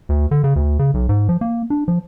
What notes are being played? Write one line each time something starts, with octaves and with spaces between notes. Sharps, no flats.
D2
D3
C#3
D2
C#3
B1
G#2
F3
A#3
D4
F3